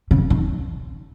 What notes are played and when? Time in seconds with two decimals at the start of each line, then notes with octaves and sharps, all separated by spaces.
0.11 C#3
0.30 D#3